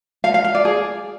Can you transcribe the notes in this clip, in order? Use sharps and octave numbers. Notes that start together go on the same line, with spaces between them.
F5
F5
F5
D5
G#4